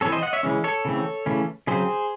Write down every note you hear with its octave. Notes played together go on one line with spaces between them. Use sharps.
E3 C4 A4 C#5
C5 D#5
D#5 F#5
C#5 E5
C#3 E3 G#3 C#4
A4 C#5
C#3 E3 A3 C4
C#3 E3 A3 C#4
C#3 F#3 C4 G#4 C5